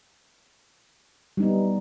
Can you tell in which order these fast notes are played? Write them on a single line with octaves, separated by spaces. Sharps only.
G3 D#4 B3